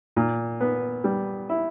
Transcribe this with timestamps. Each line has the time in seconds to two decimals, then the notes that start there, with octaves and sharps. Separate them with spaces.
0.16 A#2
0.61 B3
1.04 G3
1.49 E4